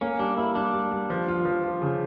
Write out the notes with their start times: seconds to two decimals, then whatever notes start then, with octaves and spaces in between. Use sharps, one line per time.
0.01 A#3 C#4
0.19 G3 D4
0.37 A#3 E4
0.55 G3 D4
0.74 G3
0.92 G3
1.10 F3
1.28 F4
1.45 F3
1.64 F4
1.82 C#3